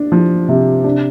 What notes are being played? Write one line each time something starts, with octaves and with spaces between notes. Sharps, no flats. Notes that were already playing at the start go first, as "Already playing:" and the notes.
Already playing: D4
F3
C3
D4